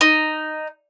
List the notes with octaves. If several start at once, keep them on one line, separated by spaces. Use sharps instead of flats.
D#4